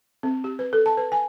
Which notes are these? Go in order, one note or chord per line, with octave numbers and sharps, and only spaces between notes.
C4
G4
B4
A4
A5
B4
G#5